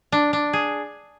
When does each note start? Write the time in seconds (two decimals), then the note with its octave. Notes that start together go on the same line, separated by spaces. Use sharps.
0.12 D4
0.33 D4
0.53 G#4